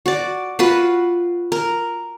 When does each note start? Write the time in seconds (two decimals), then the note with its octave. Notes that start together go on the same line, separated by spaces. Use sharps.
0.06 F#4 D5
0.59 F4 F#4 B4
1.52 A#4